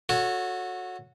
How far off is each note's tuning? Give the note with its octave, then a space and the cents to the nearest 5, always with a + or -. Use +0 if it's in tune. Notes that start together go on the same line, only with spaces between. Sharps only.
F#4 -20 A4 +0 C#5 +0